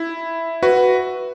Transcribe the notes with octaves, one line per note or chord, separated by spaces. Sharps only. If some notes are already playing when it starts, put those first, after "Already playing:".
Already playing: E4
F#4 B4